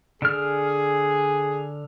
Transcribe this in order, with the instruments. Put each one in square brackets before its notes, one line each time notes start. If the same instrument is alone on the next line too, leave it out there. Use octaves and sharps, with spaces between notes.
[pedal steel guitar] D3 F6 [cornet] G#4